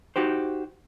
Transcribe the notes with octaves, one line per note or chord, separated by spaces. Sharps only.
D#4 F#4 G4 C5